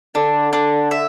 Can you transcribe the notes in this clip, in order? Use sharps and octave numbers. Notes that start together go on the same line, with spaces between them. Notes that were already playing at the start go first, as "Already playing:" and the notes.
D3 D4
D4
E5